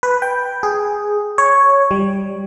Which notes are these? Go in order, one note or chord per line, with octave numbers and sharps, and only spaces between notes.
B4
G5
G#4
C#5
G3